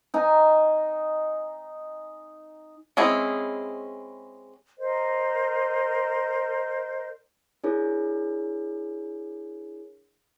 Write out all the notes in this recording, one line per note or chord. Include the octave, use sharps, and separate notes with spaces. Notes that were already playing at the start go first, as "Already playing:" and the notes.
D#4 G#5 A#5
G#3 C4 C#4 E4 G#4
A#4 C5 D#5
D4 E4 G#4 A#4 C#5